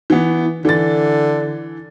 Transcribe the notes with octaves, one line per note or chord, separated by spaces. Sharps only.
E3 B3
D3 E3 A6